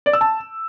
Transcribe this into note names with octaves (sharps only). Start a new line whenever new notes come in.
D5
E6
A5